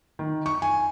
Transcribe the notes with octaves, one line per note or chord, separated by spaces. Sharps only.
D#3
C#6
G#5